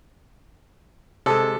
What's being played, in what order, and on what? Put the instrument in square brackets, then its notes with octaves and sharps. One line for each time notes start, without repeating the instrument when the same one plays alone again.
[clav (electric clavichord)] C3 G#3 [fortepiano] A4